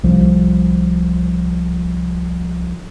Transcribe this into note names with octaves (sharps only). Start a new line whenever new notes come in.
C2 F3